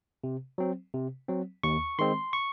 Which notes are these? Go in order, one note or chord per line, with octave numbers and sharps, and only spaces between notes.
C3
F#3 C4
C3
F#3 C4
D#2 C#6
D#3 G#3 C4 C6
C#6